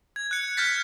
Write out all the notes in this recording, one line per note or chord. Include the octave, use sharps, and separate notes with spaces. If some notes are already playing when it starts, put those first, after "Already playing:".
G#6
F#6 C#7
F6 G6 A6 B6